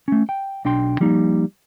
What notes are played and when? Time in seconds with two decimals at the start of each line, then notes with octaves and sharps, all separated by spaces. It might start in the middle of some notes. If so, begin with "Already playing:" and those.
0.08 A3 C#4
0.29 G5
0.65 B1 D4 G5 C6
1.00 F3 G3 A#3 D#4